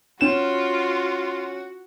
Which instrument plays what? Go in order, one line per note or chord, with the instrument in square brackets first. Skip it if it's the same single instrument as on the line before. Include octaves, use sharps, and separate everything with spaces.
[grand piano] C#4 E7 [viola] F4 [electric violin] F#4